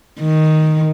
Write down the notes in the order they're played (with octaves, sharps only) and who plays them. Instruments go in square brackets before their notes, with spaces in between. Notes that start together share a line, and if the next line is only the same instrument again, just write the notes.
[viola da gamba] D#3